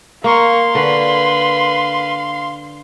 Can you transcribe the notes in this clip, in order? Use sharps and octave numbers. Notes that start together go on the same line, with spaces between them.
A#3 A#4 F5 C6 C#6
D3 B4